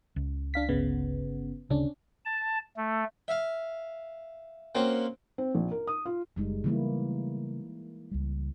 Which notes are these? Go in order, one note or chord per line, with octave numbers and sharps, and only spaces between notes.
C#2
D4 F5 B6
G1 C#3 B3
D1 C#3 C#4 D4
A5
A3
E5 F5
A#3 C4 C#4 F#4
C4
A#1
A#4
D#6
F4
F#1 G3 G#3 D#4
C#3 E3 G3 A3 A#3 E4
C#2 G3